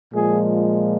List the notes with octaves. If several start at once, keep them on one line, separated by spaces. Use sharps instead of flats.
A#2 F3 G#3 G#4